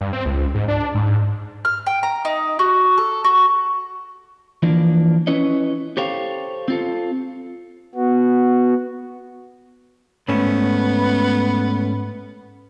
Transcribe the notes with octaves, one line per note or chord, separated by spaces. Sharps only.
G2
C4
C#2
G#2
D4
G#2
F6
G5
A#5
D#4
F#4
A4
F#4
E3 F3 A#3 D4
C#4 E4 B4 C#5 D#5
G4 A4 C5 C#5 F5 G5
C4 F4 A4
B3 F#4
G#2 A3 B3 C#4